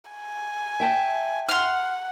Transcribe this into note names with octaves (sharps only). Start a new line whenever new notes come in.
G#5
E5 G5 A5
F#5 C6 F6